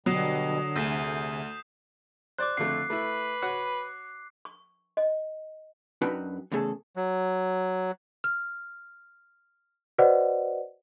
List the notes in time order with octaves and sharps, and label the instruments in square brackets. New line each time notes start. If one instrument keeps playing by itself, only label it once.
[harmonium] B2 G3 [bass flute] D3 [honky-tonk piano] F#3 [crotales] D#6 C7 E7
[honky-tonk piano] D2 [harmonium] C3 G#4 [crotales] G6 B6 E7
[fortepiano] C5 D5 [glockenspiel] D6 F#6
[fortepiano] F2 D3 A3 [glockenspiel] C7
[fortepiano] A3 E4 [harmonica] B4
[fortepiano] F#4 C#5 F#5
[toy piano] C#6
D#5
[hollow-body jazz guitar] F#2 D4 D#4 F#4 B4 G5
E2 C#3 A3 G#4 A4
[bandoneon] F#3
[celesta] F6
F#4 B4 C5 D5 D#5 F#5